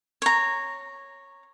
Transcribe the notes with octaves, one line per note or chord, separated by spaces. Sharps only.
C#5 A#5